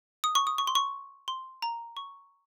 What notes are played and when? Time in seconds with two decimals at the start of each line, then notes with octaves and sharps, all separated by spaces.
0.24 D#6
0.35 C#6
0.47 D#6
0.58 C#6
0.67 C6
0.75 C#6
1.28 C6
1.62 A#5
1.97 C#6